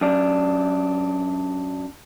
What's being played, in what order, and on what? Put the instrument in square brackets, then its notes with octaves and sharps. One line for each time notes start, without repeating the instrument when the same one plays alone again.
[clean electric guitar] F#2 D4